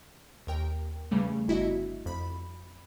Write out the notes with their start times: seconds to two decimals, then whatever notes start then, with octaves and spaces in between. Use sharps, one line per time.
0.47 D#2 A#4 G5
1.11 E2 C#3 G3 A3
1.48 G1 E4 F#4 D#5 E5
2.06 F2 B5